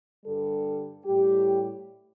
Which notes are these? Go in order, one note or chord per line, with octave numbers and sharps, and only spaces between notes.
G2 D3 G3 A4
A2 G3 G4